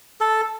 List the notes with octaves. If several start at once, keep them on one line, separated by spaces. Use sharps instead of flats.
A4